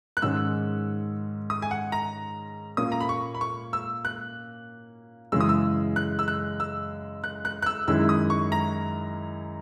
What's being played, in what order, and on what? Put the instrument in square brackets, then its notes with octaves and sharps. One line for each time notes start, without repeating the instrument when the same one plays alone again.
[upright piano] F#6
[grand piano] G#2 D#3 G#3 C#4 [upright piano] E6
[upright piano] D#6
G#5
F#5
A#5
[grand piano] A#2 A#3 C#4 [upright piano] D#6
[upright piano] A#5
B5
C#6
B5
C#6
E6
F#6
[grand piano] F#2 C#3 E3 G#3 C#4 [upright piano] E6
[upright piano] D#6
E6
F#6
E6
F#6
E6
F#6
F#6
F#6
E6
[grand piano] F#2 D#3 G#3 C#4 E4 [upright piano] E6
[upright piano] D#6
C#6
A#5